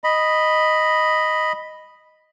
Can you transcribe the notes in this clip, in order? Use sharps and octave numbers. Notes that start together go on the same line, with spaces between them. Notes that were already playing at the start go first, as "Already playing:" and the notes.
D#5 B5